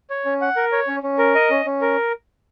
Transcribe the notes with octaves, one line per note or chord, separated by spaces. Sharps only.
C#5
C#4
F#5
A#4
C#5
C#4
C#4
A#4
D#5
C#4
C#4
A#4